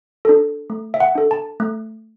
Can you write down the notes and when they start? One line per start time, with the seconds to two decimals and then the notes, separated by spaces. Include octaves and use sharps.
0.25 D4 A4
0.70 A3
0.94 E5
1.00 F#5
1.15 D4 A4
1.31 A5
1.60 A3